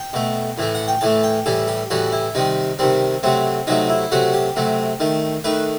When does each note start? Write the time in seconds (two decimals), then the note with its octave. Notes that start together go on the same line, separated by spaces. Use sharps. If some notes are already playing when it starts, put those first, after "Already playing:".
Already playing: G5
0.13 B2 A3
0.58 A2 E3 A3
0.75 F#5
0.88 G5
1.01 A2 E3 A3 A5
1.23 G5
1.46 A2 E3 G3 A4
1.68 G4
1.90 A2 E3 G3 F#4
2.12 E4
2.35 C3 D#3 G3 D#4
2.79 C3 D#3 G3 C4
3.23 C3 F#3 A3 C4
3.67 C3 F#3 A3 D#4
3.90 E4
4.12 C3 F#3 A3 F#4
4.33 G4
4.56 C3 F#3 A3
5.00 D#3 A3
5.44 D#3 A3 B4